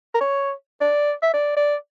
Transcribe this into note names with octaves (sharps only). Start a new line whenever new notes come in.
A#4
C#5
D5
E5
D5
D5